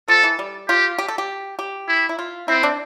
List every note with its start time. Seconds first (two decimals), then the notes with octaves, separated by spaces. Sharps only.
0.08 F3 A4
0.23 E3
0.39 G3
0.68 F4 G4
0.98 G4
1.08 A4
1.18 G4
1.59 G4
1.88 E4
2.09 E4
2.19 F4
2.48 C4 E4
2.63 D4